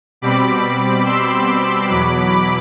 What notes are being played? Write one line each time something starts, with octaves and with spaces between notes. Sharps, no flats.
B2 G3 C4 B5 D6
C6 E6
E2 B2 F#3 B5 D6
B5 D6